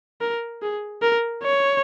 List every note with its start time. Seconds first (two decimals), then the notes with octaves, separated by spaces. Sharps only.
0.21 A#4
0.62 G#4
1.02 A#4
1.43 C#5